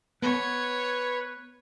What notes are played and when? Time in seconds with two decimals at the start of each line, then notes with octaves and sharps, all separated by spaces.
0.22 B3 B4 C#5